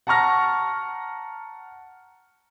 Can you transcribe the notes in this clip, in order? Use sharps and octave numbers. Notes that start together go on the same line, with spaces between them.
F#5 A5 A#5 C#6 F6 A#6